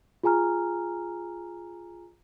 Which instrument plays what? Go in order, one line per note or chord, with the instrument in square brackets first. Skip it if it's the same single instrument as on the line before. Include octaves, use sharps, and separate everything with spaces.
[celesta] F4 G#4 G#5 A#5 F6